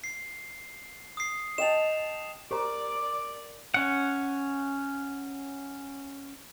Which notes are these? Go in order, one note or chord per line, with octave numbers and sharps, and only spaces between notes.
C7
D#6 C7
D#5 G5 A5 E7 F7
G4 A#4 C5 D5 A#5 D6
C#4 F#5